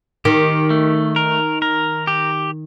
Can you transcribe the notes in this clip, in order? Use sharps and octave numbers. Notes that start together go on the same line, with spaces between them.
D#3 G4
A3
A#4
A#4
G4